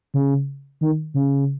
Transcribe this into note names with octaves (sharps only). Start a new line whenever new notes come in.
C#3
D#3
C#3